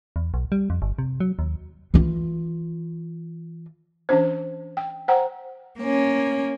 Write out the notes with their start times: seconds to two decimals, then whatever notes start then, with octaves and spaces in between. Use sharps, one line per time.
0.16 E2
0.34 B1
0.52 G3
0.70 F2
0.82 G1
0.98 C3
1.20 F#3
1.39 D#2
1.94 E3 F4
4.09 E3 C#4 D4 C5
4.77 G5
5.08 C5 F#5 G5 A#5
5.80 A#3 C#4